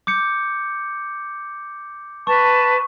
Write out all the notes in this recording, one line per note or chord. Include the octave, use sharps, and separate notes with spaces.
D6 G6 C#7
B4 A5 C#6